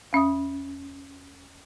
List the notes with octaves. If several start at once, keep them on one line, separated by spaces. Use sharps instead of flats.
E2 C#4 E5 D#6